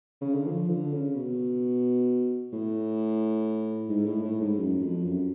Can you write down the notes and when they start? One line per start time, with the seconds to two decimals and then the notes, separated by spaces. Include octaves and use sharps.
0.21 C#3
0.34 D3
0.47 F3
0.70 D3
0.93 C#3
1.15 B2
2.53 A2
3.89 G#2
4.06 A2
4.24 A2
4.41 G#2
4.58 F#2
4.81 F2
5.04 F#2